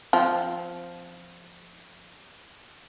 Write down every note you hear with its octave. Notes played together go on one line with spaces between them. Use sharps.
F3 C4